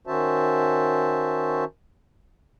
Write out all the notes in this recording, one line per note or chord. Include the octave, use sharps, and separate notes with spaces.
D#3 C#4 F#4 C5 E5 A5